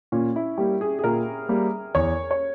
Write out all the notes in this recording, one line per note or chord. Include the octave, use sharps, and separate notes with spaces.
A#2 C#4
E4
G3 A#3 G4
G#4
G#4
A#2 A#4
G3 A#3
E2 C#5
C#5